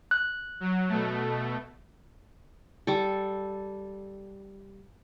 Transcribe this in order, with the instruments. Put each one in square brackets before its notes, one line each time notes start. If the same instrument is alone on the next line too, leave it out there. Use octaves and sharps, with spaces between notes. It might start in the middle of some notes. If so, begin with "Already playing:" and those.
[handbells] F#6
[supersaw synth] F#3
B2 A3
[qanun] G3 A4